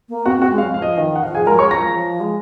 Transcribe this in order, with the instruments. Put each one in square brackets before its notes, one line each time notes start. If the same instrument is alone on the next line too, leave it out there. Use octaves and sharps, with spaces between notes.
[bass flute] A#3
[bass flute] C4 [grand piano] F#4 F#5
[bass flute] C4 [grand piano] F#4 F#5
[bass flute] G#3
[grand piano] F5
[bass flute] F#3
[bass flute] F3 [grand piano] F5
[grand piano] D#5
[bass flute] D#3 [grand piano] D#5
[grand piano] F#5
[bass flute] F3 [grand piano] F5
[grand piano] G#4 G#5
[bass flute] G#3 [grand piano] A#4 A#5
[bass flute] F#3
[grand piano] C#5 C#6
[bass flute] G#3
[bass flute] F3 [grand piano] A#5 A#6
[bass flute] F3
G#3